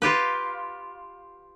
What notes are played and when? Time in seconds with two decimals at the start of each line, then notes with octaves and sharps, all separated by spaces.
0.02 F4 G4 B4